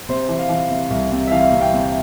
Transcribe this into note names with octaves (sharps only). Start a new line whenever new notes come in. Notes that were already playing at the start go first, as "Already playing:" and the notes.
C3 C5
E3
F5
E3
C3
C2
C3
E5
E3 F5
C3
G5
C3